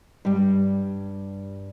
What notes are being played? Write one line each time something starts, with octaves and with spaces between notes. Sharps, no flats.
G2 G3